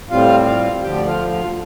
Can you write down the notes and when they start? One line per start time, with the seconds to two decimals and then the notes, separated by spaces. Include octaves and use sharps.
0.10 A2 G3 C4 F4 F5
0.46 F4 F5
0.83 D2 D3 F3 G4 G5
0.96 D5
1.07 F4 F5
1.31 F4 F5